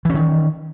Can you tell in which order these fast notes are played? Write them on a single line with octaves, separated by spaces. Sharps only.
E3 C#4 D#3